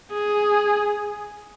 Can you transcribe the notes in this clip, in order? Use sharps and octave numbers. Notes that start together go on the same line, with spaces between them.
G#4